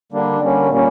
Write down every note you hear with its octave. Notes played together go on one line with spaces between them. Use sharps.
D3 G3 A#3 D4
D3 G3 A#3 C#4
A#2 G3 A#3 C#4